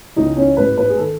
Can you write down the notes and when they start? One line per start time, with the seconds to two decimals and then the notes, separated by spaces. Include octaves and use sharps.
0.16 C#2 C#3 E3 D#4
0.37 C#4
0.57 A1 G#2 E3 B4
0.77 B4
0.89 G#4
0.98 D#3 A4